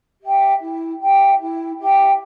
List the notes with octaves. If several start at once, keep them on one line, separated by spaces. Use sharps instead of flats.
G4 E5 G5
E4
G4 E5 G5
E4
G4 E5 G5